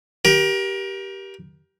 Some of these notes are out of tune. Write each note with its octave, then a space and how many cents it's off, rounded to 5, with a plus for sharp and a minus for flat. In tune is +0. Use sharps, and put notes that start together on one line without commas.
G4 -10 A#4 +30